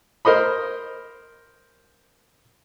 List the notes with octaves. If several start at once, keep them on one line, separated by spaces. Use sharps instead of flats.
A#4 C5 D#5 B5